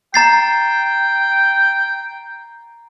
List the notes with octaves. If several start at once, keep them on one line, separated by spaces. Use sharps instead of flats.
G5 A#5 A6 C7